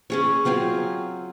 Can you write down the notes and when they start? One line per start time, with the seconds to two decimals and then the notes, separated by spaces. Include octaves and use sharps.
0.10 C#4 G#4 C#5
0.45 F#3 C4 F4 G#4